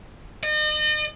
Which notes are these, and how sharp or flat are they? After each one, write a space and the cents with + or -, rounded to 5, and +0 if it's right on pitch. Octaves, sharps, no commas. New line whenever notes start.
D#5 -40